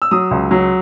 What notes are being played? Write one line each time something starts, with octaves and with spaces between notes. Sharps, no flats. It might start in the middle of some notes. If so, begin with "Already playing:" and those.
E6
F#3 D#6
C#2
F#3